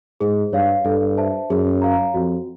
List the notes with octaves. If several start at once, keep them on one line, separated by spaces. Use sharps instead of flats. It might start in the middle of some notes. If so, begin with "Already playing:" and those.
G#2 G#4
G2 C#5 F5
G2 A4
C5 E5 A5
F#2 G#4
C#5 F5 A#5
F2 F#4